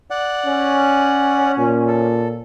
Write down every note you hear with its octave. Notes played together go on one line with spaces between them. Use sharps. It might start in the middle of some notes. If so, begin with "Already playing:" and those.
D5 F#5
C#4
A#2
A4